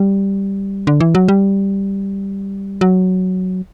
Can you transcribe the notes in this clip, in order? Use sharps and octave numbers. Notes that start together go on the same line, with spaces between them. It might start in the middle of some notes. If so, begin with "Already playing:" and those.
Already playing: G3
D3
E3
F#3
G3
F#3